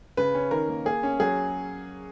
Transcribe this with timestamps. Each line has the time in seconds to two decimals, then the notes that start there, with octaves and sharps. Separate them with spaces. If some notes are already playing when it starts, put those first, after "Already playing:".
0.17 C#3 B4
0.34 C#4
0.51 D#3 A#4
0.69 A#3
0.85 A#3 G#4
1.03 C#4
1.20 F#3 G#4